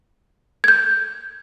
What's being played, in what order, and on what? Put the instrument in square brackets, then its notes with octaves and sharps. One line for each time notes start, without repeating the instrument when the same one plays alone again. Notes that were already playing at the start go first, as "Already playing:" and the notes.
[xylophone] G6 G#6